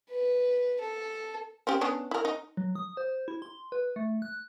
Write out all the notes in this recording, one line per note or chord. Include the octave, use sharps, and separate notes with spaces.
B4
A4
C4 C#4 G4
B3 C#4 D4
E4 A#4
D#4
F#3
D#6
C5
E4
C6
B4
A3
F#6